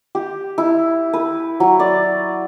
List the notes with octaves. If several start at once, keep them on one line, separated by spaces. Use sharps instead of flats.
G4
E4
B4
F#3
D5